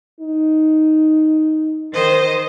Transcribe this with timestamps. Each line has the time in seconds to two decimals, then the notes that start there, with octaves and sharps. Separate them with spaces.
0.20 D#4
1.93 D#3 C5 D#5